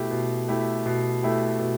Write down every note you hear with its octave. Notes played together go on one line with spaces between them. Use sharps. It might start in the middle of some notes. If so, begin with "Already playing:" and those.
Already playing: B2 A3 E4 G4
B2
A3 E4 G4
B2
A3 E4 G4
B2